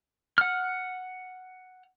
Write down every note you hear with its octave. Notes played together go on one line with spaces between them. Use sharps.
F#5 F6